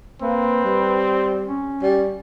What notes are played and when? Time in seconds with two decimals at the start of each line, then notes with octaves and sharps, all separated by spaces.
0.22 A#3 C4 B4
0.65 G3
1.47 C#4
1.82 G3